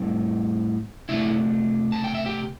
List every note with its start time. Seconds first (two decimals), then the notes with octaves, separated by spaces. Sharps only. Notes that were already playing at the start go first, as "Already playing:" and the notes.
Already playing: A2 G3 C4
1.09 C3 A3 D4 E4 E5
1.92 A5
2.04 G5
2.15 E5
2.26 G4 G5